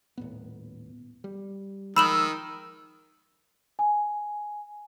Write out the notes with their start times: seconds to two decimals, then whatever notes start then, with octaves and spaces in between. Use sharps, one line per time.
0.18 D#1 A2 B3
1.24 G3
1.96 D#3 F3 G#3 B5 E6 E7 F#7
3.79 G#5